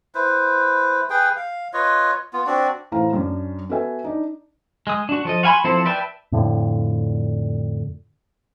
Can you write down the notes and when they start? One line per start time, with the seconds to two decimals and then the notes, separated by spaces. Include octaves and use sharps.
0.15 E4 B4 C5
1.10 G#4 B4 G5
1.36 F5
1.73 F4 B4 C#5 D#5
2.33 B3 F4
2.47 C4 D4 F#4 D5
2.92 A2 E3 C5 F5 A#5
3.13 F#2 C#4 D4
3.69 B3 F#4 A4 B4 E5 G#5
4.04 D4 D#4
4.87 G#3 D#6
5.09 D4 F#4
5.25 F3 A4 D#5
5.43 F#4 F5 G#5 B5 C6
5.64 F3 C4 E4 A4 C5
5.86 B4 D5 E5 G5 A5
6.32 F2 A2 D3